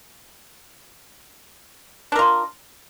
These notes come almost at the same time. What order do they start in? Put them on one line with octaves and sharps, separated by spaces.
D4 A#4 F4